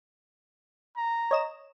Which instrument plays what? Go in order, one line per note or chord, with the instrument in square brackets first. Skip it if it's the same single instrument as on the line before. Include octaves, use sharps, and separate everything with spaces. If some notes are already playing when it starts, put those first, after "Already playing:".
[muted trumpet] A#5
[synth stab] C#5 D#5 E7